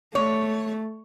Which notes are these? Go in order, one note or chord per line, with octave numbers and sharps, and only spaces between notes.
A3 C#5